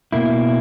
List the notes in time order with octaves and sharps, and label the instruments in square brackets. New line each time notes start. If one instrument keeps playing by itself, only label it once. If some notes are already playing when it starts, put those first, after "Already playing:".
[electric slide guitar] B2 A#3 E4